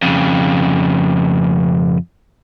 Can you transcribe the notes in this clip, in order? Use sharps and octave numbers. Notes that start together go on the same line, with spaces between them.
F2 C#3